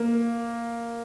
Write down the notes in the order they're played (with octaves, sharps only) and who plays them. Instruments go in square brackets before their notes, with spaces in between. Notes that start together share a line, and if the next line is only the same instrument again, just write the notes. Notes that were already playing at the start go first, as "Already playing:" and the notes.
Already playing: [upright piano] A#3